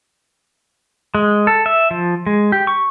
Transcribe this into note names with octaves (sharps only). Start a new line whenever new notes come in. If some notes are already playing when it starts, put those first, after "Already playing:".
G#3
A4
E5
F3
G#3
G4
C#6